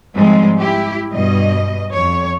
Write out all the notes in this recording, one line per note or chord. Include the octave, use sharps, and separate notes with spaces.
G#2 F3 G3 G#3 C4
E4 G4
G2 B2 D#5
F2 C#5